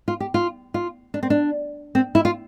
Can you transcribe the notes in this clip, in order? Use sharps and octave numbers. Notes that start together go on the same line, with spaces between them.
F4
G4
F4
F4
D4
C4
D4
C4
E4
F4